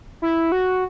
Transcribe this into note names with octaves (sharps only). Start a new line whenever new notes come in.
E4
F#4